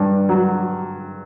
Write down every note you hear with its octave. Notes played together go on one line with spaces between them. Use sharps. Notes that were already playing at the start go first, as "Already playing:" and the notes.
Already playing: G2
F#3